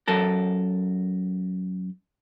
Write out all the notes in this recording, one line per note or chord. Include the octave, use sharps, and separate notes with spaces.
F#2 A4 A#4